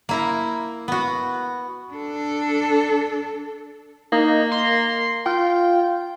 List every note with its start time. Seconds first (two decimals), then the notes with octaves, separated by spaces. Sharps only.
0.09 A#3 E4 A#5
0.88 B3 F#4
1.93 D4 A4
4.12 A#3 D#4
4.52 C6
5.26 F4 G5